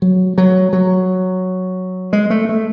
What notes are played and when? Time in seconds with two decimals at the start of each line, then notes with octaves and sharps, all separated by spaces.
0.02 F#3
0.38 F#3
0.73 F#3
2.13 G#3
2.30 A3
2.49 A3